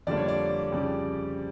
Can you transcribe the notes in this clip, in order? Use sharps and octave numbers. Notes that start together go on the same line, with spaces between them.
F2 D3 G3 A#3 D4 D5
C#5
D5
F2 C#3 G3